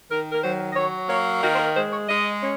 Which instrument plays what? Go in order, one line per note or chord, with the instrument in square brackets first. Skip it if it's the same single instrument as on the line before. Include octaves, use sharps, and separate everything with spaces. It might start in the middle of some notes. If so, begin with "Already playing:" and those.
[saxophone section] D#3 A#4
A#4
F#3 C5
D#5
F#3 C#5
A#3 C#5
D#3 F#4
C5
A#4
G#3 C5
C#5
G#3 D#5
C#4